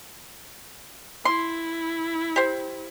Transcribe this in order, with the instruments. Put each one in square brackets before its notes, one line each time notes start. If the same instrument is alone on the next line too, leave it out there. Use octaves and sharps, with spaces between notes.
[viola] E4 [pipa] C6
[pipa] G4 C5